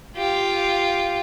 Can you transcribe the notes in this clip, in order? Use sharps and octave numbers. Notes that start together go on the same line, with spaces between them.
F4 G4